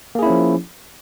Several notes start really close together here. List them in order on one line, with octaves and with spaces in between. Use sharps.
A#3 G#4 E4 C#4 F3